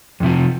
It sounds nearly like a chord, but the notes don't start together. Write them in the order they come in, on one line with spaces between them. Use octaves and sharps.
F2 C3 F3